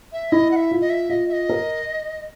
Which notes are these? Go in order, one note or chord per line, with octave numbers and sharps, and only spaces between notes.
E5
E4 D#5
F#5
E5
F4
D#5
E5
F4 D#5
E5
D#5
A#4